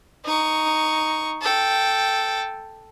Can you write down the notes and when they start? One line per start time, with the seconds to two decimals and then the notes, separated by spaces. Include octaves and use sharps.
0.25 D#4 C#6
1.42 A4 G5